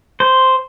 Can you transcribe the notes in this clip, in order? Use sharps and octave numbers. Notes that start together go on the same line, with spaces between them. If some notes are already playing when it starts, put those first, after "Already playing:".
C5